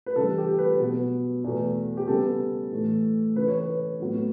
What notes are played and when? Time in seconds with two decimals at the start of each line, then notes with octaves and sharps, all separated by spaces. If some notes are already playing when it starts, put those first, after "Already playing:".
0.06 B4
0.16 C#3 E3 G3 A4
0.38 G4
0.58 B4
0.80 B2 F#3 B3
1.44 E2 B2 A3
1.97 G4
2.08 C#3 G3 B3 A4
2.72 A2 E3 A3
3.36 C#3 E3 A3 B4
3.48 C#5
3.59 B4
4.00 A2 F#3 B3